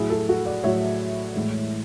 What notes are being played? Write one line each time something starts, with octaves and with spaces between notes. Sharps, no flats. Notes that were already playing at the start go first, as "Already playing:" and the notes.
Already playing: A2 F#3 E4 G#4
F#4 A4
F#4 A4
D5 F#5
A2 F#3 C#5 E5
A2 E3 G#3